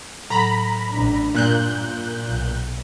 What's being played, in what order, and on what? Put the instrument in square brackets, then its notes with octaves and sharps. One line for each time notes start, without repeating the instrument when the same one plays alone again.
[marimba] A2 F#3 [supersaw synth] A#5 B5
[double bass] A1 D4
[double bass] G2 [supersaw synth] A#2 F#6 G6
[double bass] B1